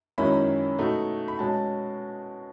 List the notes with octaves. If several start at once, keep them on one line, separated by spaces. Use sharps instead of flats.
F#2 D#3 G#3 C#4 E4 B5
B2 A3 D#4
B5
B2 G#3 C#4 A5